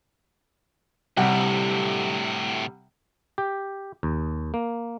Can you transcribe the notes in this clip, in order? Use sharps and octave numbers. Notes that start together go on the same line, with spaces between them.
D2 A2 C3 G3 F#5
G4
D#2
A#3